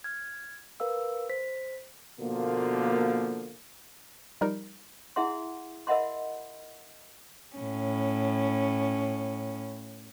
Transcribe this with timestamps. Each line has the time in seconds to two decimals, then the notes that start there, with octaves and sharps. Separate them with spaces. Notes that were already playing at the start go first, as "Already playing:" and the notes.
0.04 F6 G#6
0.80 A#4 B4 F5 E6
1.29 C5 B6
2.20 B2 D3 F3 A#3
4.41 F3 G3 D#4 A#4
5.16 E4 G#4 E5 F#5 C6
5.87 A#4 D#5 E5 F#5 B5 C6
7.56 A2 C#4